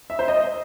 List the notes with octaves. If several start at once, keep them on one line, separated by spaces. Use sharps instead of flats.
E5
C5
D#5